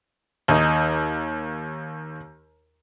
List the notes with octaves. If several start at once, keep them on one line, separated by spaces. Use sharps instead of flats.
D#2 D#4